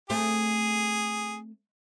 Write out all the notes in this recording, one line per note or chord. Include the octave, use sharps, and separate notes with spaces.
A3 C4 G#4